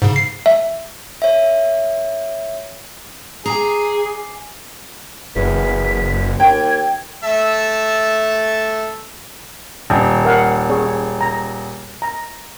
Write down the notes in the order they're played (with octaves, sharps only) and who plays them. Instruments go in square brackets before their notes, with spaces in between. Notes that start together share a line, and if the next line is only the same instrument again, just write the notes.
[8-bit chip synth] G#2 C#3
[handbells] C7
E5
[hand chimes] C#5 E5
[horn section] G#4 [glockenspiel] G#5 D6 C7 [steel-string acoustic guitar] A#5
[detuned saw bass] F#1 [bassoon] E2 [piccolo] B6
[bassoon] D#2 [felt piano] G5 [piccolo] G#6
[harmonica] A3 E5 A5
[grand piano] D#1
[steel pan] A#4 F5 F#5
G#4 C#5
A#5
A#5